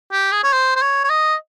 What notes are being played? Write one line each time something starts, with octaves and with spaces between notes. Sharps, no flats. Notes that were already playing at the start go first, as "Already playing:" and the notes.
G4
G#4
C#5
C5
C5
C#5
C#5
D#5